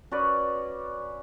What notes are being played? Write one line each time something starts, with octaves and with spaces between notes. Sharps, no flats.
C#4 F#4 B4 D5